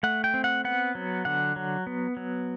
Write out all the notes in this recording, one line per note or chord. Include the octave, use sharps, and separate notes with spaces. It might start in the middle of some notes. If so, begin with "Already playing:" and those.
A3 F#5
G5
C4
F#5
B3 F#5
F#3
D3 F#5
F#3
B3
F#3